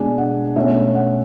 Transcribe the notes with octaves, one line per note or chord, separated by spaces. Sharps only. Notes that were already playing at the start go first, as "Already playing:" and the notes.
Already playing: B2 G#3 D4 G#5
F#5
B2 A3 C#4 E5
F#5